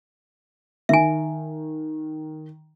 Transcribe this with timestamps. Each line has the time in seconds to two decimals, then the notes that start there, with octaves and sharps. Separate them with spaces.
0.89 D#3 E5 G#5